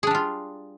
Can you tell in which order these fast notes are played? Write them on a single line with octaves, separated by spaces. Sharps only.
G#4 D4 G3 F4